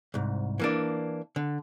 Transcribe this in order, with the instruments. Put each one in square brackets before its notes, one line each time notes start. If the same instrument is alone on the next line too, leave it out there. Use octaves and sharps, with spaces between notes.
[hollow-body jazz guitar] C2 G#2
E3 A#3 D4
D3